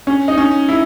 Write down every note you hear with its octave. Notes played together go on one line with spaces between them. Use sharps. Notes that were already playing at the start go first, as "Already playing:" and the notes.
C#4
D#4
C#4
E4